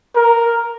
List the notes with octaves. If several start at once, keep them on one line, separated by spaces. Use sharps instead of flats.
A#4